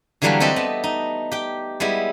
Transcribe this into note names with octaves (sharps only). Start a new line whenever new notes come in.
D3 E3 F#3 G3 A3 A#3
C4 G4 A4 D#5 E5
B3
D#4
G4 G5
G3 G#3 B3 E4